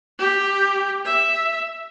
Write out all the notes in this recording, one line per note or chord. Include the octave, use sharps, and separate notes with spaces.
G4
E5